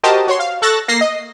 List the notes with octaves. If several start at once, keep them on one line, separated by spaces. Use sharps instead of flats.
F#4 G4 A#4 C5 D#5 A5
F#4 C#5 C6
F5
A4 C#6 E6 F#6 A6 A#6
A#3 A#6 C7
D#5